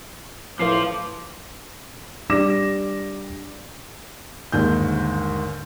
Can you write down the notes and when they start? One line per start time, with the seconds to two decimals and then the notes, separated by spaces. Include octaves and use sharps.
0.59 A2 F3 F4 B4 D6 C7
2.29 G3 D4 D5 D6 A#6 E7
4.52 G1 D#2 G#2 G6